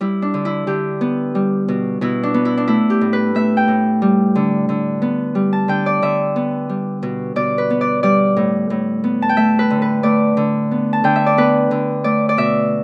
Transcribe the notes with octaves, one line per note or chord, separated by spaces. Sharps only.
G3 E4
D4
D3
E4
D3 G4
B3
G3
B2
B2 E4
D4
B3
E4
D4
A3 E4
G4
A2
B4
A3 E5
G5
A2
G3
D3
D3
B3
G3
A5
D3 G5
D5
D3 E5
B3
G3
B2
B2 D5
B4
B3
D5
G3 D5
A2
A2
B3
A5
G5
A3 E5
B4
D3
B4
A3 D5
D3
B3
A5
D3 G5
E5
D5
B3 B4
D3
A3 D5
D5
B2 E5